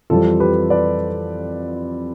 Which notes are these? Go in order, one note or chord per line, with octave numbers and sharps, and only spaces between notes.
F2 E3 G3 C4 F4 A4
G4 B4
B4 D5